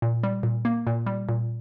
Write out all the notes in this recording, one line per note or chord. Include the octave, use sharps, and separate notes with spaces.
A#2
G3
A#2
A#3
A#2
G3
A#2